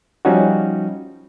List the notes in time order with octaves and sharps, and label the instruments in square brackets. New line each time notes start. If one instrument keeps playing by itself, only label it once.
[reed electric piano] F3 G3 C#4 D#4 F#4